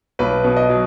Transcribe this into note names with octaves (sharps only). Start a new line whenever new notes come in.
B1 B4
B2
D#5
F#3